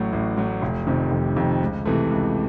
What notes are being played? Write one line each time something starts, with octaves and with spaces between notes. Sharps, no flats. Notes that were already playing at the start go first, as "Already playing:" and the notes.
Already playing: A1 A2 F#3
A1
A2 F#3
F1
F2 C3 D#3
F1
F2 C3 D#3
C#2
C3 E3 A3
C#2